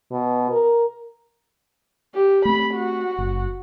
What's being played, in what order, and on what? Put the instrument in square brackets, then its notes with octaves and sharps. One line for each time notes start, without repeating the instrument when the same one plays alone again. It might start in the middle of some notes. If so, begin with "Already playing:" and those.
[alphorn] B2
A#4
[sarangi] G4
[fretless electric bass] A3 C4 [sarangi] B5
[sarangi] F#4
[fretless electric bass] F#1